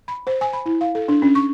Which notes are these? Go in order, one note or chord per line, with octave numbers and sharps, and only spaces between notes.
B5
C5
G#5
B5
E4
F5
A4
D4
C#4
C#6